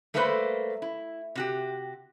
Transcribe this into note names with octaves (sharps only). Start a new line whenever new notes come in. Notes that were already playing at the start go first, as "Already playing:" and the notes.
G3 A3 A#3 A4 B4 C5
E4
C3 F#4 G4